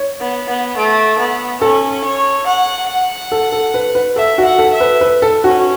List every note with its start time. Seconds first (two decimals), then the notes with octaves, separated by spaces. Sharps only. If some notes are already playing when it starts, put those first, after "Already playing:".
Already playing: C#5
0.20 B3
0.49 B3
0.77 A3
1.19 B3
1.61 C#4 A4
2.04 C#5
2.46 F#5
2.89 F#5
3.32 A4
3.52 A4
3.74 B4
3.95 B4
4.16 A4 E5
4.38 F#4
4.45 F#5
4.59 A4
4.73 E5
4.80 B4
5.01 B4
5.22 A4
5.44 C#4 F#4